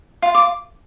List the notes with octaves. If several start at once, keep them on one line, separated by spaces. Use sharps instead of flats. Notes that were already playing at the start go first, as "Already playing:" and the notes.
F4
D6